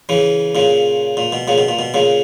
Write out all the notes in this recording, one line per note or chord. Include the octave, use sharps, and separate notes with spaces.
C#3 E3
A#2 C#3
A#2
B2
A#2 C#3
B2
A#2
B2
A#2 C#3